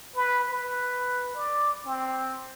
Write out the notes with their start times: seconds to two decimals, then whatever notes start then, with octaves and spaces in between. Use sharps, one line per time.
0.15 B4
0.49 B4
1.35 D5
1.85 C4